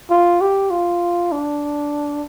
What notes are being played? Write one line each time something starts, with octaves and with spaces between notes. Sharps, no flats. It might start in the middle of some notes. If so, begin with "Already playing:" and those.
F4
G4
F4
D4